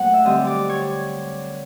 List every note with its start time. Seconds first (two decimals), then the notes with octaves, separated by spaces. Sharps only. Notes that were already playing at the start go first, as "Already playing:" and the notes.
Already playing: A#2 F#3 A3 F#5
0.14 E5
0.25 D3 G3 C4 D#5
0.47 D5
0.69 C#5